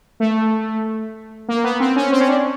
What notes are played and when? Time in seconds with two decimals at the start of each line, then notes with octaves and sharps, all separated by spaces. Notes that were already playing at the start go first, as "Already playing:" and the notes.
0.20 A3
1.48 A#3
1.64 B3
1.80 C4
1.96 C#4
2.12 C4
2.20 C#4
2.28 D4